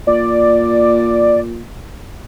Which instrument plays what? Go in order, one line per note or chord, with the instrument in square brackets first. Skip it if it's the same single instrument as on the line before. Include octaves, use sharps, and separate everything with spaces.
[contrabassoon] A#2 [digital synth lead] D5